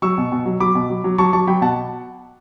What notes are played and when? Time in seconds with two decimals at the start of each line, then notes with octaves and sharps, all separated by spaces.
0.02 F#3 C#6 E6
0.18 B2
0.32 B2
0.46 F#3
0.60 F#3 B5 D6
0.75 B2
0.90 F#3
1.04 F#3
1.18 F#3 A5 C#6
1.33 F#3 A5 C#6
1.47 F#3 G5 B5
1.61 B2 F#5 A5